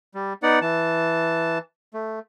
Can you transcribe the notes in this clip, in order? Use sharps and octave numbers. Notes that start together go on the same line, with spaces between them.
G3
B3 D#4 D5 F#5
E3 A5
A3